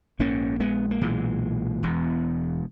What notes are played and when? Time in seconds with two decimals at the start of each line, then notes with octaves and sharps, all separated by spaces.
0.19 A#1 G#2 A#3 C#4
0.60 G#3 B3
0.91 A#3
1.01 B1 A#2 E3 G#3
1.83 E1 E2 B2